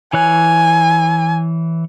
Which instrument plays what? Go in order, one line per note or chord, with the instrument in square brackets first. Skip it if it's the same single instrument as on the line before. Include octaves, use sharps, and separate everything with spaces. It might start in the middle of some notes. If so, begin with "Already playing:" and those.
[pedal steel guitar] E3 C#5 F#6 [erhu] G#5